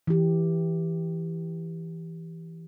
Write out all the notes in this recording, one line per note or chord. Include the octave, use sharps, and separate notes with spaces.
E3 G4